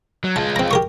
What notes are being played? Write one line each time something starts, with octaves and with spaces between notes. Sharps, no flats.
F#3
G#3 F4 A5
C4 A#5
G4 A#4 C#6